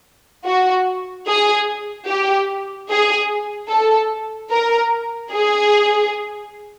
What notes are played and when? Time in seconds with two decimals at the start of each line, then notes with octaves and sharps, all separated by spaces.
0.45 F#4
1.27 G#4
2.07 G4
2.89 G#4
3.70 A4
4.51 A#4
5.32 G#4